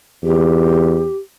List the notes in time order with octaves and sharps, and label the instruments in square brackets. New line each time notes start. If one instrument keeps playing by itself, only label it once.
[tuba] E2 [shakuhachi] G4